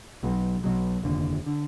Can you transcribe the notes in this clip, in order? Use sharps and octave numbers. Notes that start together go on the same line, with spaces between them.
B1 B2 F#3
B1 B2 F#3
F1 D#2 D3
D3